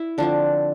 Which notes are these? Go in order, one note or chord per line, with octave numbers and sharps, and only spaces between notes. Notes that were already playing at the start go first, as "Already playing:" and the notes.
Already playing: E4
D3 F3 C4 D4